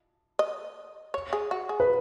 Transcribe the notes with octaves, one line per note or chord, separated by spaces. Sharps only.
D#5
C#5
G#4
F#4
G#4
B4